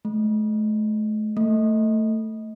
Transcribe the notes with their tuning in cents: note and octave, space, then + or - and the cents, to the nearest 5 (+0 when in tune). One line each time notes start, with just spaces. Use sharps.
A3 -40
A3 +15